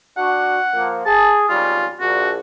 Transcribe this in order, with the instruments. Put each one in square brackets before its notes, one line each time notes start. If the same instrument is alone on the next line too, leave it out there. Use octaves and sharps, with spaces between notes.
[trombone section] D4 F#4 [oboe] F#5
[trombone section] F3 A#3
[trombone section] G#4 [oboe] A5
[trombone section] G#1 C#3 G3 [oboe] F4
[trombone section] A#1 [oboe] F#4